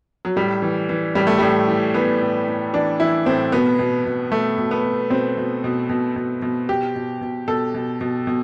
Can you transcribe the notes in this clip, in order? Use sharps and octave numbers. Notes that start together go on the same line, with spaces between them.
F#3
A2 G3
E3
E3
A2 G3
A3
A2 G3
E3
E3 B3
A2
A2
E3 D4
E3 E4
A2 C4
B2 B3
B2
B2
B2 A3
B2
B3
B2
B2 C4
B2
B2
B2
B2
B2
B2 G4
B2
B2
B2 A4
B2
B2
B2